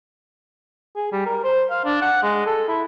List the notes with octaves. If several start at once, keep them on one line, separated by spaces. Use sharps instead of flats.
G#4
G3
A#4
C5
F5
D4
F#5
G#3
A4
E4